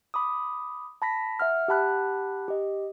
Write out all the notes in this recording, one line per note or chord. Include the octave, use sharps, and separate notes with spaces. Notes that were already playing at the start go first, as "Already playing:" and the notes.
B5 D6 D#6
A5 B5 A#6 B6
E5 F#5 F6
G4 F#5 A5 B5 F#6
G4 D#5